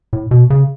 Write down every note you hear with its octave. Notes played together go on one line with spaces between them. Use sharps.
A2
B2
C#3